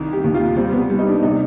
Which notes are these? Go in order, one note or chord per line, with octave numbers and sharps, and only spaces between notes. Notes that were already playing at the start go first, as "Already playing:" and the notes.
Already playing: C2 D#3
G4
D#2
F4
G3 C4
B3
G3
D#4
D4
C3 D#4